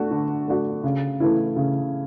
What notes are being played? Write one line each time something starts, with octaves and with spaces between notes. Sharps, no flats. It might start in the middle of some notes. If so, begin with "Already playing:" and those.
Already playing: A3 D4 F#4
D3
A3 D4 F#4
C#3
E3 A3 E4
C#3